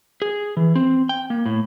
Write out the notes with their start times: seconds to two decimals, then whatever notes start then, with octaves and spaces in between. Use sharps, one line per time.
0.22 G#4
0.57 E3
0.75 C4
1.09 G5
1.30 A#3
1.46 A2